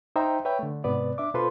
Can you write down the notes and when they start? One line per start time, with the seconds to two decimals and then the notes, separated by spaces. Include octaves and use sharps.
0.16 D#4 C5 E5 G5 A#5
0.45 B4 C#5 E5 G5
0.59 D3 A3
0.84 G#2 C3 B3 B4 D5
1.18 D4 E5 D6
1.34 B2 F4 A4 B4 C5 C6